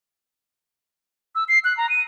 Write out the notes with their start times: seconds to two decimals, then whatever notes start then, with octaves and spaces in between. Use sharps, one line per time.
1.35 E6
1.49 C7
1.65 F#6
1.77 A#5
1.90 D#7